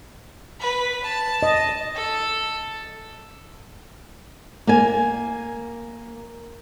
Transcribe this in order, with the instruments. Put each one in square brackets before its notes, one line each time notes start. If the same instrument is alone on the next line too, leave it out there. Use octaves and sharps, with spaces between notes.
[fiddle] B4
A5
[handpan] D#5
[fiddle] A4
[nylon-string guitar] A#3 G#5